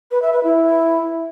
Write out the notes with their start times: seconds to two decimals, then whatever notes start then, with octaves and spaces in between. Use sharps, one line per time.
0.11 B4
0.22 E5
0.33 B4
0.44 E4